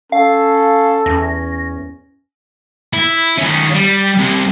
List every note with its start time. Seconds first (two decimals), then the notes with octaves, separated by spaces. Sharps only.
0.12 C#4 A4 F5
1.06 E2 C#4 A#6
2.93 E4
3.38 D#3 C#4
3.74 G3
4.18 C2 C3